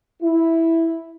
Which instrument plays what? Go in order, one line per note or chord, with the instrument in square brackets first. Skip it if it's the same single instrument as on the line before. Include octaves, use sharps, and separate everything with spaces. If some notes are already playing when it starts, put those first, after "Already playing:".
[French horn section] E4